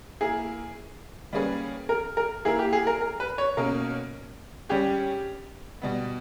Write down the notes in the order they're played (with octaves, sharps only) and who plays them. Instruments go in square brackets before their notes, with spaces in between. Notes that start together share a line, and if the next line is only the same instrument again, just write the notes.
[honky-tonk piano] A#3 E4 A#4 [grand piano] G#4
[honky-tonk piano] G3 A#3 C#4 G#4 B4
[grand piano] A#4
A#4
[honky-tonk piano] A#3 E4 A#4 [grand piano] G#4
[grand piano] G4
G#4
A#4
A#4
B4
C#5
[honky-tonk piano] B2 A#3 C#4 [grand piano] A#4
[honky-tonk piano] G3 C#4 G#4 [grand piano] G4
[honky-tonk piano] B2 G3 B3